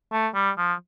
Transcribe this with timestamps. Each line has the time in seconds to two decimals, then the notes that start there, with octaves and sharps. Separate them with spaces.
0.12 A3
0.34 G3
0.58 F3